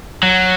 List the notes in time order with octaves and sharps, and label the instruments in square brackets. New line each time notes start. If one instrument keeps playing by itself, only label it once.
[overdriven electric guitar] F#3